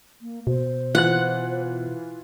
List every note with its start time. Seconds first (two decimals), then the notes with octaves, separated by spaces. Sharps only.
0.22 A#3
0.47 B2 C5
0.95 E3 F4 F#5 F#6